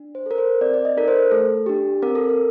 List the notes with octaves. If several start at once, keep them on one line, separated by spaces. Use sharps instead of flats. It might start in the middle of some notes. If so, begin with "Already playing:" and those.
Already playing: D4
C5
A4 A#4
C5
C4 D5
D5
D#5
D#4 A4 A#4
C5
A3 A4
D4 G4
C4 A#4
A4
A#4